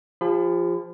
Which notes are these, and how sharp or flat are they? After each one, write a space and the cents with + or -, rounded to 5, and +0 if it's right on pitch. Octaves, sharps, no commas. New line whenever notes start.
F3 +0 G4 +45 B5 +35